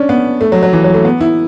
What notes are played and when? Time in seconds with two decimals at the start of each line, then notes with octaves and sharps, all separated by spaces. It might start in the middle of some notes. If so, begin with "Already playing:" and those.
Already playing: C#4 D4
0.09 B3
0.41 A3
0.52 F#3
0.63 F#3
0.73 E3
0.84 F#3
0.94 A3
1.05 B3
1.21 E4